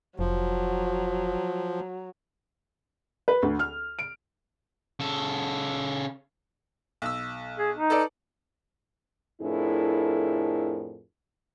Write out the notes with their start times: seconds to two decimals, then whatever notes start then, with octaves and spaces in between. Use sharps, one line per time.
0.19 F1 F3 F#3
3.28 B4
3.42 D2
3.59 F6
3.99 D7
5.00 C#3 A4
7.02 B1 E6
7.58 G#4
7.76 D#4
7.90 A4 B4 D5
9.42 F2 A2 D4 E4 G#4 A#4